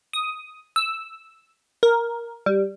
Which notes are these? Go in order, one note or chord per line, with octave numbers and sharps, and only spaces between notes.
D#6
E6
A#4
G3